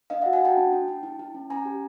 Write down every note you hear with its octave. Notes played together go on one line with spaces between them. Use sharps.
D4 D#5 F5
F#4 E5 F#5
F#5 G#5
F#4 G5 A5
D4
D4
D4
E4
E4
C#4
C#4 G#5 A#5
G4